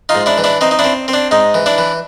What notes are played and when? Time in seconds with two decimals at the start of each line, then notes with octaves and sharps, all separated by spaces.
0.09 D#4 F4
0.15 G#2
0.26 D4 E4
0.38 E3
0.44 D4 E4
0.61 C4 D#4
0.71 D#4
0.79 D4 E4
0.84 C4
1.08 C4
1.13 D4
1.31 G#2 D#4
1.54 E3
1.66 D4 E4
1.78 E3